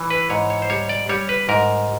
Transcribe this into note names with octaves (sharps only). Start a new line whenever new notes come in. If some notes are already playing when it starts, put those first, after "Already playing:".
Already playing: E3
B4
G#2 C#5
C#5
C5
G3 C#5
D5
G3 C#5
B4
G#2 A#4